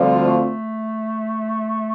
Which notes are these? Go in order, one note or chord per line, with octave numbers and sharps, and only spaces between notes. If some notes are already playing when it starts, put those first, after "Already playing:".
Already playing: D2 D3 F3 G3 C4 F4
A3